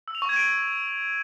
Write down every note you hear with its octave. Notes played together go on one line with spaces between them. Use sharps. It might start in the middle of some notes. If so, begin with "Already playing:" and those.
E6
F7
C#6
G#6
D7